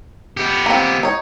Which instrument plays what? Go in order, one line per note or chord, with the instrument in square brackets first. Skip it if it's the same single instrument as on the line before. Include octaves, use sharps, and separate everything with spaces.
[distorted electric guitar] B3 G4
[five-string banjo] A#3 C4
D#4 C#5